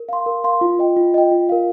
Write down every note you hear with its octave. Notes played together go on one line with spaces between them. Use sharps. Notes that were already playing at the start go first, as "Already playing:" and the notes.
Already playing: A#4
F5 C6
A#4
F5 C6
F4
D#5 G5
F4
D#5 G5
F4
A#4 F5